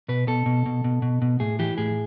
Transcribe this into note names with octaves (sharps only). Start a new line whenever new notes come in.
B2 B4
B2 A4
B2
B2
B2
B2
B2
A2 G#4
E3 G4
A2 G#4